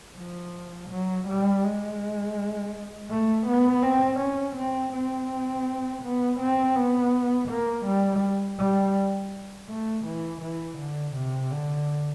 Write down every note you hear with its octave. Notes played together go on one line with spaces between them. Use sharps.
F3
F#3
G3
G#3
A3
B3
C4
C#4
C4
C4
B3
C4
B3
A#3
G3
G3
A3
E3
E3
D3
C3
D3